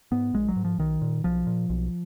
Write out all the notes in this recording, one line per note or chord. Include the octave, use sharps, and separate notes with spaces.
G#2 B3
A#1 G#3
F#3
G#2
F3
B1 D#3
A#2
B1 F3
A#2
B1